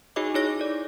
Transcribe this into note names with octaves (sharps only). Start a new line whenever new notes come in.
D#4 F#4 G#4 C#5 D#5 D6
D#4 E4 G#4 C#5 D6 A#6
A4 D5